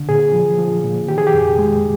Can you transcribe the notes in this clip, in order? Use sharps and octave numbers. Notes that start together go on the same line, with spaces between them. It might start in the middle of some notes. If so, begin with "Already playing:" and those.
Already playing: D3
A#2 G#4
F3
F3
A#2
D#3 G4
G#4
G4
F2
G#3